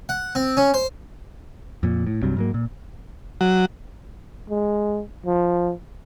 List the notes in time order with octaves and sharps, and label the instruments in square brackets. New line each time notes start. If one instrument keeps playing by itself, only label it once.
[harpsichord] F#5
C4
C#4
C5
[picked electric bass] F2 A#2
A2
C2 G2 C3 F#3
G#2 F#3 A#3
A#2
[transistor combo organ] F#3
[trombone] G#3
F3